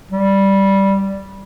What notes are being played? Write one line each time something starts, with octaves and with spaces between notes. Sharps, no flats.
G3